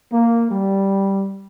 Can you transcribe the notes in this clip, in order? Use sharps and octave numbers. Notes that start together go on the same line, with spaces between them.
A#3
G3